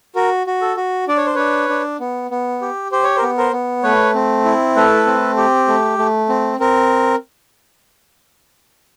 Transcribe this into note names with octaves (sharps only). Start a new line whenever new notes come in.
F#4 A#4
F#4
A4
F#4
D4 D5
C#5
C5
D4 B4 C#5
D4
B3
B3
G4
G4 C5
C#5
A#4 C5
B3
A#4 C5
B3
A3 B4 C#5
C4
E4
A3 A4 B4
C4
G4
A3
A3
C4
C4 A#4